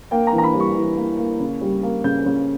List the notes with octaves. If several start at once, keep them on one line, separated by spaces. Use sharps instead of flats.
A#3 G5
A#5
E3
A#5
B5
G3
C#6
E3
A#3
A#3
C#3
G3
A#3
C#3 G6
C#3